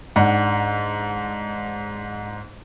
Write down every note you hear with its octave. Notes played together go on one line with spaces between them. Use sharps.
G#2 D4 F#5